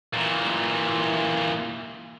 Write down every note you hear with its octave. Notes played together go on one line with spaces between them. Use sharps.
A#2 E3